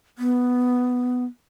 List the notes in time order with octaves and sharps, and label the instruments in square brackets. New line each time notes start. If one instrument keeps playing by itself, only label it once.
[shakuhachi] B3